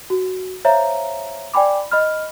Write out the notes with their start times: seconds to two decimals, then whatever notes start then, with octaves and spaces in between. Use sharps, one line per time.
0.10 F#4
0.65 C5 C#5 E5 F5 A#5
1.54 D5 G5 G#5 B5 D6
1.91 D#5 B5 F6